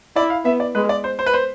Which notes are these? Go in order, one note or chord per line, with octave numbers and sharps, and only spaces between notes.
E4 D5
F5
B3 E5
D5
G#3 B4
D5
C5
C5
B4
C5